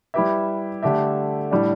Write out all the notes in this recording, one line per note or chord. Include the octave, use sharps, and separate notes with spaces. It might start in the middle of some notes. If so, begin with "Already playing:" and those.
G3 E4 G4 B4 E5
D3 A3 G4 E5
A2 G3 D4